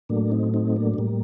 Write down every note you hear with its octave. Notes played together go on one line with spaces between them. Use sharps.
A2 F#3 A3 A#3 D4
C4 D#4
C4 D#4
A#3 D4
A3
A2 G3 A#3